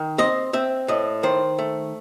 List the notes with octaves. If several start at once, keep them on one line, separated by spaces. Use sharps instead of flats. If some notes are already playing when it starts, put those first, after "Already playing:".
Already playing: D#3
C4 D#5
C4 E5
A2 D#5
D#3 C5
A3